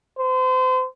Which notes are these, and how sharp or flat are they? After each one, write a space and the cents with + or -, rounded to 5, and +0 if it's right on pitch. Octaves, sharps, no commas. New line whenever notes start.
C5 -35